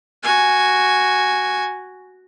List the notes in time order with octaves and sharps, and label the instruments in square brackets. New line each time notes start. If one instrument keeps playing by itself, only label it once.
[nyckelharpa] F#4 G#5